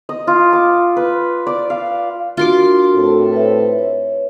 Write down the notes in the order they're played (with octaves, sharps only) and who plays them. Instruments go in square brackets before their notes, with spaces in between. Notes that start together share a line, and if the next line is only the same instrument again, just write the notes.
[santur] D#5
F4
D6
B4
D5
F5
[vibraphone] D4 F#4 A#4 [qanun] F4 C6 D6
[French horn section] A2 C4 A4
[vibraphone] B4 C#5 E5
C#5